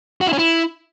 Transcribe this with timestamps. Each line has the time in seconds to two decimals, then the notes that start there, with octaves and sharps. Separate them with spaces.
0.21 F#4
0.27 E4
0.33 C#4
0.39 E4